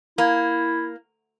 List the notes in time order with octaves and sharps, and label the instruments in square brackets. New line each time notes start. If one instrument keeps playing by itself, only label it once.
[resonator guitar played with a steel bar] A#3 [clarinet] E4